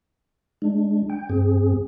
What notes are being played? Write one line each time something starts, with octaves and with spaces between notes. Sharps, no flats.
G#3 D4
G5
G2 C4 G#4